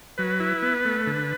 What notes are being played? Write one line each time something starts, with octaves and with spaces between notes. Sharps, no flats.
F#3 B4
E4
B3
A3
D3